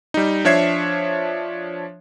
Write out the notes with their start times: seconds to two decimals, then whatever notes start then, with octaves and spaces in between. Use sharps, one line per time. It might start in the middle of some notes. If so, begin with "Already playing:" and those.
0.14 G3 D#4
0.45 F3 D4 C#5 E5 G#6 C7